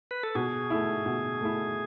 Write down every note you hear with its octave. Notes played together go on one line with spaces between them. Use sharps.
B4
A4
B2 G#4
A3 E4
B2
A3 E4